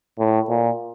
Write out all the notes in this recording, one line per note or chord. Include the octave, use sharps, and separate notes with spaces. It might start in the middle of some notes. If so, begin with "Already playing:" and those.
A2
A#2